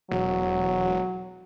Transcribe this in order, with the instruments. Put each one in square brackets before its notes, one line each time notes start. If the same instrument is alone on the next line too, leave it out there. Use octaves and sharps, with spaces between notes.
[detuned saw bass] E1 [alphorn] F#3